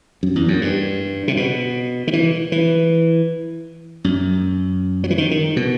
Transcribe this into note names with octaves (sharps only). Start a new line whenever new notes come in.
F#2
E2
F#2
G2
C3
B2
D#3
E3
E3
F#2
F#3
E3
D#3
D#3
B2